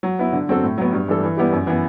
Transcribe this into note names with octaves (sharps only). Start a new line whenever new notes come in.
F#3
B3 E4
D3
F#3 C4 F#4 A4
A2
F#3 B3
G2
E3 G3 D4 A4
E3
G3 B3 E4 G4
F#2
E3 B3